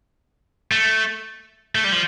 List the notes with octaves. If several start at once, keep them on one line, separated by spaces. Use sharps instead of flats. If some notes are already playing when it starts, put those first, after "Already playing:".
A3
A3
G3
F3